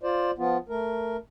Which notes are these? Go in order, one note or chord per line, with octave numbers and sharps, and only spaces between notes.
F4 C5 D5
F3 B3 F4
A3 A#4